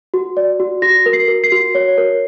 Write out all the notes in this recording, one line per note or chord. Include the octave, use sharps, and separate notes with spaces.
F#4
D5
F#4
F#4 A#6
A#4
C7
A#4
C7
F#4
C#5
A#4